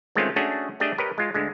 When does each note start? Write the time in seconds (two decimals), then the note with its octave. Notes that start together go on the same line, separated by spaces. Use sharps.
0.16 D#3 G#3 A3 C4 C#4 F4
0.36 A3 C#4 D4 F#4 G#4
0.80 A3 D4 G4 G#4 D5 D#5
0.98 G4 A#4 B4 C#5 D#5
1.18 G#3 F4
1.34 D2 D3 G#3